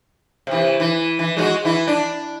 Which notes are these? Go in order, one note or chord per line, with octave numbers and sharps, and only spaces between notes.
C3 E3
E3
E3
G#3 D4 F#4
E3 E4
D4